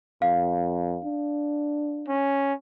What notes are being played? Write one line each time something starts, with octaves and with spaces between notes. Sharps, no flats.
F2 F5
D4
C#4